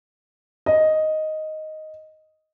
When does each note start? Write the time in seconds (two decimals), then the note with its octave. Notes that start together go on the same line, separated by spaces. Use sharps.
0.66 D#5